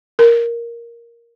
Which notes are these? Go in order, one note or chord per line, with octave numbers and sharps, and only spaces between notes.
A#4